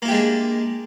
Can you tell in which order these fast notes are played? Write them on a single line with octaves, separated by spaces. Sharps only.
A#3 E4 G4 G#3 D4